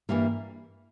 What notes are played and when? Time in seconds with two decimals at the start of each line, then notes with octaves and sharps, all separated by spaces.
0.09 G2 E3 G3 A#3 E4